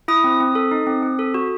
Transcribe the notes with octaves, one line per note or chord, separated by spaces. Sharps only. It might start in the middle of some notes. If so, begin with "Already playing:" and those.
E4 D#6
C4
C4
A4
D#4
C4
C4
A4
F#4